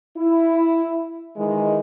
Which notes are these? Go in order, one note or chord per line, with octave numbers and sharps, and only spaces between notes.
E4
D#3 E3 G#3